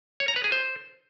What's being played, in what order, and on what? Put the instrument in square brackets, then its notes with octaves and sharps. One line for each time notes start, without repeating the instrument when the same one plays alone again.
[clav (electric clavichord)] C#5
A#5
B4
G#4
C5